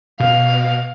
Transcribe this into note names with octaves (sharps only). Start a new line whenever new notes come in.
B2 F5